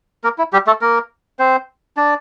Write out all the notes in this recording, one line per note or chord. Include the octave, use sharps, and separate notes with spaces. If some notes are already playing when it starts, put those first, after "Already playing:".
A#3 A#4
E4
G3 G4
A3 A4
A#3 A#4
C4 C5
D4 D5